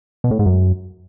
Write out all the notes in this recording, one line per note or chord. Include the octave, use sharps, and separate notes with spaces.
B2
A2
G#2
F#2